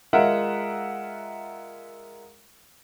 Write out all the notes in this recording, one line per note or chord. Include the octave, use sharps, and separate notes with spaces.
G#3 F4 A#4 E5 F#5